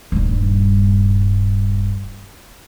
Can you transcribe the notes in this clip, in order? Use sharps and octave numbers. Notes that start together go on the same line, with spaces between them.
D#1 G2